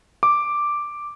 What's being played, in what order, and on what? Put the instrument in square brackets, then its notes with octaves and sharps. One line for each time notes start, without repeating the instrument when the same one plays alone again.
[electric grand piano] D6